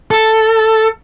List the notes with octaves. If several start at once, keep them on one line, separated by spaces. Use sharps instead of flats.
A4